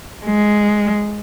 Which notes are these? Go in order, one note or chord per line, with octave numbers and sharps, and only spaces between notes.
G#3